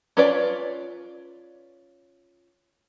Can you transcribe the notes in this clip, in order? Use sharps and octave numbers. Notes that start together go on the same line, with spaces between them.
C#4 F4 B4 C#5 D5